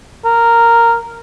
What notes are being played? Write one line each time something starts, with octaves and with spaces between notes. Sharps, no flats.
A#4